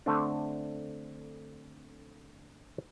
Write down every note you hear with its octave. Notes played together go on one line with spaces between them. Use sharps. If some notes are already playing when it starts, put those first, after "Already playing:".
D3 A3 C4 D4